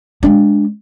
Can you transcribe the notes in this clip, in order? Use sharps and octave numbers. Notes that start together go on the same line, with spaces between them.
G#3 D4